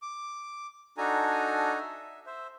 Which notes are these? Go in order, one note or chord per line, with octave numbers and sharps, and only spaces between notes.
D6
D4 D#4 F#4 A4 G#5 A#5
E5
C5 E5